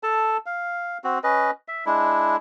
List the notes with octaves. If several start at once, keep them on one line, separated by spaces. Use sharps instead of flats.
A4 A5
F5
C4 F#4
C#4 B4 D#5
E5
G#3 D4 E4